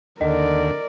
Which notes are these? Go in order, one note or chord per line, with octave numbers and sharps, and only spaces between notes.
D#2 D3 A#4 D5 D#5